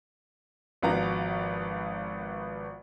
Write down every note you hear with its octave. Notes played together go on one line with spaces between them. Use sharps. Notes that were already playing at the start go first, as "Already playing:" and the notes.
G#1 F3 B3 F#4 A#5